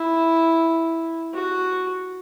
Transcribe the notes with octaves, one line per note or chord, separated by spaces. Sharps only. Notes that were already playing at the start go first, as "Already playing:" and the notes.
Already playing: E4
F#4